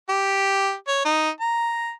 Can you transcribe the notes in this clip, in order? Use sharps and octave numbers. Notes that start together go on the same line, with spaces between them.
G4
C#5
D#4
A#5